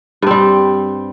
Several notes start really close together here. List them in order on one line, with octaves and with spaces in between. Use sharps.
G2 C4 G3